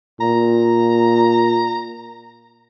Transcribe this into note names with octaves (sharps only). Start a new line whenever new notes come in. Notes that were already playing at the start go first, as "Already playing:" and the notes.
A#2 A#5